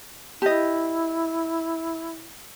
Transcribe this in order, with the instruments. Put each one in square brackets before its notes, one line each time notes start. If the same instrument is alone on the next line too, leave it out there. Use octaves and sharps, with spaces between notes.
[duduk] E4 [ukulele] G4 D#5